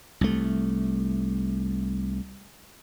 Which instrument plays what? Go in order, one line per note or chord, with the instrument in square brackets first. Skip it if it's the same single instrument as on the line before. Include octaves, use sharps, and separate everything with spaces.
[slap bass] C2 A3